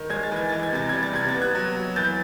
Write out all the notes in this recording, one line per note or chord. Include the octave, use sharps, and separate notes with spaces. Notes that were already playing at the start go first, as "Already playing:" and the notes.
Already playing: D#3
G#3 G#6
A6
E3 G#6
E3 A6
G#6
C3 A6
G3 G#6
A6
C3 G#6
A6
B3
F#6 G#6
F#3
F#3
E3 G6 A6